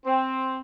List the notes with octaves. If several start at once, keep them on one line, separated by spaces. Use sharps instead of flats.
C4